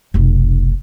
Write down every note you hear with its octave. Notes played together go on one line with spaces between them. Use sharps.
F1 B1